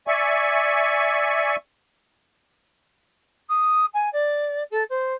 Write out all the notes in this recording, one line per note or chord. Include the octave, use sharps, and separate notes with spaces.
D5 E5 G#5 C#6
D#6
G#5
D5
A4
C5